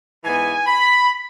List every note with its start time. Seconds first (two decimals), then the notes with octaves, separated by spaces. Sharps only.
0.24 G#2 E3 B3 G#5
0.66 B5